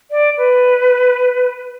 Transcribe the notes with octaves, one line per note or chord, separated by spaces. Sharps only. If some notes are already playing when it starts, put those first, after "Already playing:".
D5
B4